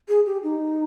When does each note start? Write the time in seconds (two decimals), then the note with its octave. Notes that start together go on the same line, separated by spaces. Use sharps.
0.08 G#4
0.26 G4
0.43 D#4